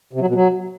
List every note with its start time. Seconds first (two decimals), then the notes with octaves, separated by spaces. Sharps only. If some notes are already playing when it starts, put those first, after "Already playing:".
0.13 C3
0.20 F#3
0.28 B2
0.35 F#3